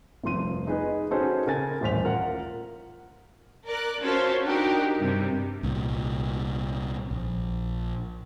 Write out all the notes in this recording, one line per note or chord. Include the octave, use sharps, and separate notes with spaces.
F1 C2 F3 C6 D#7
D#4 G#4 B4 D#5
C#4 D#4 F#4 G#4 A4 C5
C#3 A#4 G#5 A6
D#1 A1 C5 B6 F7
F4 A#4 F#5
A#4 D5 F#6
C#4 F4 F#4 A4 C5 C#5
D4 D#4 F#4 G4 A#4
G2 C3 G3
C2 A#2
A#1